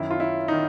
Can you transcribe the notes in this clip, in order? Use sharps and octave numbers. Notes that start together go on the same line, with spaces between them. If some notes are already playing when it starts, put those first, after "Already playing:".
Already playing: F#2 D#3 E4
F4
E4
D#3 D#4